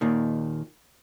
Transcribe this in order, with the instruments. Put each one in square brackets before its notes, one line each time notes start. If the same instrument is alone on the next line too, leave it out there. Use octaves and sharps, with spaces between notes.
[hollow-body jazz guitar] D#2 A#2 D#3